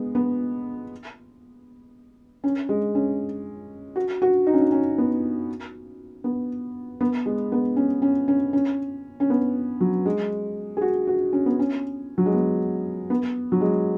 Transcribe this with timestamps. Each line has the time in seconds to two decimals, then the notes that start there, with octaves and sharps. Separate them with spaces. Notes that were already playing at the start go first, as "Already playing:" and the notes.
Already playing: G#3 B3
0.15 B3
2.44 C#4
2.69 G#3
2.95 C#4
3.96 F#4
4.22 F#4
4.47 D#4
4.54 C#4
4.62 D#4
4.72 C#4
4.98 B3
6.24 B3
7.01 B3
7.26 G#3
7.52 B3
7.76 C#4
8.02 C#4
8.28 C#4
8.53 C#4
9.20 C#4
9.30 B3
9.81 F#3
10.06 G#3
10.77 G#4
10.81 F#4
11.07 F#4
11.33 C#4
11.46 B3
11.59 C#4
12.18 F#3
12.26 G#3
12.34 B3
13.10 B3
13.52 F#3
13.61 G#3